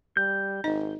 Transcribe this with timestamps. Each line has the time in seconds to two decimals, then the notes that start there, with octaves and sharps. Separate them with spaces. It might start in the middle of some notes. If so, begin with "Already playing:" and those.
0.17 G3 G6
0.64 G#1 D#4 D#5